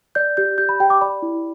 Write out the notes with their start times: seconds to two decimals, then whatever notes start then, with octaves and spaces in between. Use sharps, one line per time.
0.15 D5 G6
0.37 G4 G6
0.58 G4 G6
0.69 B5
0.80 G4 G5
0.90 D6
1.01 D5 B5
1.22 E4